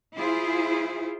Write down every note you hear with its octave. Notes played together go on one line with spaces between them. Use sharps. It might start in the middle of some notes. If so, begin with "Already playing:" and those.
E4 F4 G#4 C5